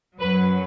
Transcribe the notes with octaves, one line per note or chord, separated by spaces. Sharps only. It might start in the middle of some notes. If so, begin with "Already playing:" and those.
F#2 F#3 B4